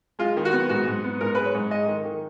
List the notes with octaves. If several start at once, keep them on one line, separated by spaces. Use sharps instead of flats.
G#3 F4
D#3
F#4
B3
G#2 F#4
G#2
B3
G#2 A#4
G#3 B4
C#5
G#2
G#3 D#5
D#3
D#3